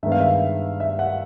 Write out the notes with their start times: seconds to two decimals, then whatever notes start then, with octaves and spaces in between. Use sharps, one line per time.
0.03 G2 D#3 G#3 B3 E5
0.12 F5
0.20 E5
0.80 E5
0.99 F#5